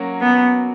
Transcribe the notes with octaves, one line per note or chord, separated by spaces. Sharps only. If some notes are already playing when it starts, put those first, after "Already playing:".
Already playing: F#3 A#3 C#4 F#4
B3